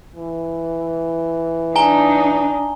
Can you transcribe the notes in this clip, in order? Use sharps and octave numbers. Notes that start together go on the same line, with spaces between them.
E3
D4 D#4 G#5 A#5 G7